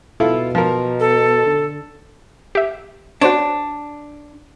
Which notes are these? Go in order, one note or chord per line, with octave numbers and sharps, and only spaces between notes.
B2 E4 F4 A4
F3 A#4
A4
D3
G4 E5
D4 F#4 C5 C#5